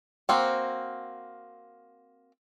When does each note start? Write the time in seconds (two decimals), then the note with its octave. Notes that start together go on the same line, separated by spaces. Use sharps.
0.29 A#3 C4 F#4